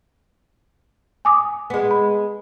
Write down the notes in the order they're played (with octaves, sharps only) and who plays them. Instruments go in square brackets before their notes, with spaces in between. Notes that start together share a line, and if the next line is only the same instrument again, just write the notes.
[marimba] G#5 D6 D#6
[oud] G#3 B3
[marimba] B5